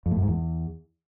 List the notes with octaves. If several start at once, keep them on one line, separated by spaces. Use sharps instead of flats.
F2
A2
F#2
G#2
E2